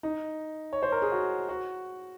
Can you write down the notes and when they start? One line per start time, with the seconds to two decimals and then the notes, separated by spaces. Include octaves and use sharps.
0.03 D#4
0.73 C#5
0.83 C5
0.92 A#4
1.02 G#4
1.12 F#4
1.49 F#4